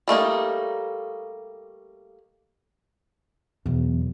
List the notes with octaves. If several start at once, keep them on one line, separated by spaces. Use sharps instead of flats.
G3 A3 A#3 D#4
E2 B2 F#3